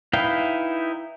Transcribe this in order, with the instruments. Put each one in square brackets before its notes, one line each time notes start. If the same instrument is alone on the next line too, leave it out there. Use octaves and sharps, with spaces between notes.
[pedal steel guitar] D#4 E4 B4 F5 G5